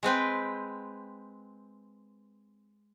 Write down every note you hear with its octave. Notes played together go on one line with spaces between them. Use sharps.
G#3 C4 B4 G5